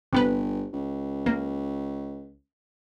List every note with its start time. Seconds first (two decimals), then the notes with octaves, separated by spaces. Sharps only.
0.13 G1 C3 B3 B4
0.73 C#2
1.26 A#3